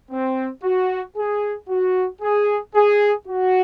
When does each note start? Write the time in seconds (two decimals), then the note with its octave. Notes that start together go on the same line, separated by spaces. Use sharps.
0.11 C4
0.64 F#4
1.17 G#4
1.69 F#4
2.22 G#4
2.75 G#4
3.27 F#4